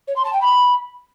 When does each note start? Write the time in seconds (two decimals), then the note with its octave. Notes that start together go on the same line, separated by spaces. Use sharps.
0.08 C#5
0.16 C6
0.25 A5
0.33 G5
0.41 B5